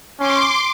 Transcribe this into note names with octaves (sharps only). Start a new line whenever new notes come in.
C#4 C6 D6